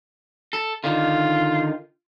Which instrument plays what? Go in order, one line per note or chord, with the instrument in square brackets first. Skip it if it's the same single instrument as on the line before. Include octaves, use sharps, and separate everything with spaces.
[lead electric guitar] A4
[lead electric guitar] D3 D#3 [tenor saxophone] F4